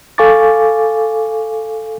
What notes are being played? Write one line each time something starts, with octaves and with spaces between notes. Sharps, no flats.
A4 F5 G#5 C#6 D6 A6